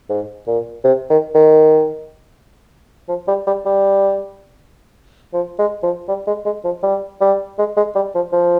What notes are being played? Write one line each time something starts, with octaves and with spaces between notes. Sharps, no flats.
G#2
A#2
C3
D#3
D#3
F3
G3
G3
G3
F3
G#3
F3
G3
G#3
G#3
F3
G3
G3
G#3
G#3
G3
F3
F3